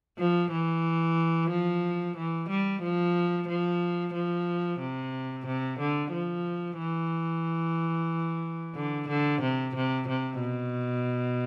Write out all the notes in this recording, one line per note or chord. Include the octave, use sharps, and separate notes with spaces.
F3
E3
F3
E3
G3
F3
F3
F3
C3
C3
D3
F3
E3
D3
D3
C3
C3
C3
B2